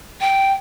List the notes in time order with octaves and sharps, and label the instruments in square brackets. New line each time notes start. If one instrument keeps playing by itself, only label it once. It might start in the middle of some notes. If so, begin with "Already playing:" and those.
[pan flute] G5